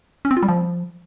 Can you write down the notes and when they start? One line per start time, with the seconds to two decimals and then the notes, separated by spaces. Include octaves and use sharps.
0.25 C#4
0.31 C4
0.37 F4
0.43 G3
0.49 F3